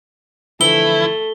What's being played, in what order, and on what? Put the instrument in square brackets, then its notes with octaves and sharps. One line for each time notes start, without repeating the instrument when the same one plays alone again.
[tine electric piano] D3 E3 F3 [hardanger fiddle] A3 [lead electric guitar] E4 [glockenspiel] G7